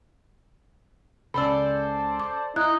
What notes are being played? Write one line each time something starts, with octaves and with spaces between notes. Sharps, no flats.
C#2 C#3 A4 C5 D5 B5 E6
D6
D#4 E4 F#6